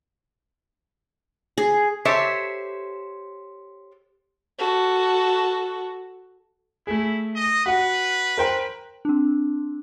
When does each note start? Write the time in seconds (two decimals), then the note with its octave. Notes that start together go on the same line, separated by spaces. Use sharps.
1.58 G#4
2.05 G4 A4 C5 C#5 E5
4.59 F#4 A4
6.87 A3 E4 G#4
7.36 D#5
7.66 F#4 B4 F#5
8.38 A#4 C5 G5
9.05 C4 D4